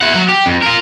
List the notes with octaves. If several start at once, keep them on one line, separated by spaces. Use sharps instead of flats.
E4 F#5
F#3 F#5
G4
F2
F4 A#4